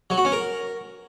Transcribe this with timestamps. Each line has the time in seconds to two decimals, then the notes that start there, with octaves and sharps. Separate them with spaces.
0.10 F#3
0.17 F#4
0.25 C#4
0.32 A#4